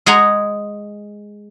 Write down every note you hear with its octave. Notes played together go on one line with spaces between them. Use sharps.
G#3 G#4 D#5 F#5 G#5 A#5